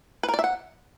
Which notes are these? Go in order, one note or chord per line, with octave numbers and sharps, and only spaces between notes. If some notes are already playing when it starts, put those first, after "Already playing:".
B4
A#4
D5
E5
F#5